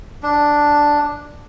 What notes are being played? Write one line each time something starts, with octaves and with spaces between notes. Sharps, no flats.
D4